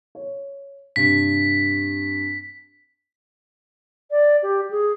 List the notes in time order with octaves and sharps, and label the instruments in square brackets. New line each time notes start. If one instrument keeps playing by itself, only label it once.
[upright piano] C#5
[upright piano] G2 C3 [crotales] B6
[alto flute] D5
G4
G#4